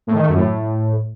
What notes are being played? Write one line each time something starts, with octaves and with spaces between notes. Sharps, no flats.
A2
D#3
A3
F#2
A2